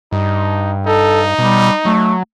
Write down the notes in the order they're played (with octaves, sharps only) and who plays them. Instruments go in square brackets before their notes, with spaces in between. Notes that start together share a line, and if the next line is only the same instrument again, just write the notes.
[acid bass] G2 [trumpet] D#4
[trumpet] D#4 [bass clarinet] A4
[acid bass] B2 [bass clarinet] G3
[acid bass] F#3 [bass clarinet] A3